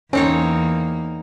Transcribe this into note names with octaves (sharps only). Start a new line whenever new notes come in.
E2 A#3 C4 C#4 D#4 C#5